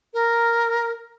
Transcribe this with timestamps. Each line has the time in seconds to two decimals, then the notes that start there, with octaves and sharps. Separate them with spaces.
0.14 A#4